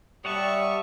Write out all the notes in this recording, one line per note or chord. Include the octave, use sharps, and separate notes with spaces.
G3 C#5 E5 F#5 A5 C#6 D#6